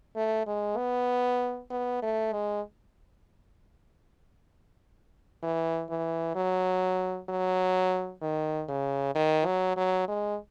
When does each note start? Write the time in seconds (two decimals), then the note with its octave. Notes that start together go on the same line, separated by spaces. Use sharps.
0.16 A3
0.47 G#3
0.77 B3
1.70 B3
2.02 A3
2.33 G#3
5.43 E3
5.90 E3
6.35 F#3
7.29 F#3
8.22 D#3
8.69 C#3
9.15 D#3
9.46 F#3
9.77 F#3
10.08 G#3